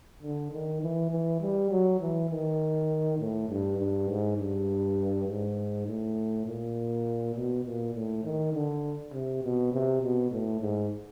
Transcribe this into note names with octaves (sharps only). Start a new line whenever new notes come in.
D3
D#3
E3
E3
G3
F#3
E3
D#3
A2
G2
G2
G#2
G2
G#2
A2
A#2
B2
A#2
A2
D#3
D3
C3
B2
C3
B2
A2
G#2